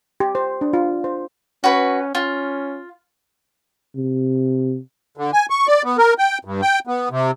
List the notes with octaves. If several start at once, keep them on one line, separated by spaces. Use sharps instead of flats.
G4
C5
D4
F4
C5
C#4 F#4 B4
C#4 F4
C3
D3
G#5
C#6
D5
B3
A#4
G5
G2
G5
B3
C3